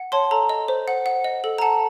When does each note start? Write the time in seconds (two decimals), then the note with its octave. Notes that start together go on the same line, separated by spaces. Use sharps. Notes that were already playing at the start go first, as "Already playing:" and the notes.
Already playing: F#5
0.12 C#5 A5 C6
0.31 A4 A#5
0.49 D#5
0.68 C5
0.88 F#5
1.06 F#5
1.24 D#5
1.44 A4
1.58 A#5
1.62 F#5 A5